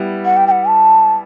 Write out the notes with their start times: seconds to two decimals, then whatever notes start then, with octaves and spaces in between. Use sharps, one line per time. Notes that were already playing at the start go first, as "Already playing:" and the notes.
Already playing: G3 B3 E4
0.25 F#5
0.37 G5
0.47 G5
0.51 F#5
0.68 A5